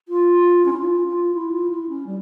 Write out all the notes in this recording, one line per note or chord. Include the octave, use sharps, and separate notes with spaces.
F4
C#4
E4
F4
F4
E4
F4
E4
C#4
G3